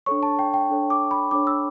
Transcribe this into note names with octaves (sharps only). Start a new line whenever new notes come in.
D4 A4 C#5 C#6
A5
G5
G5
D4 A4 C#5
D6
B5
D4 A4 C#5 D6
E6